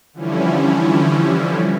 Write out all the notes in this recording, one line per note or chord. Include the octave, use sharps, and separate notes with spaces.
D3 E3 F3 G3 C#4 E4